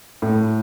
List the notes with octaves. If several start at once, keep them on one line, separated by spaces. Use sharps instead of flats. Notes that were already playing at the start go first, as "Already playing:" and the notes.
A2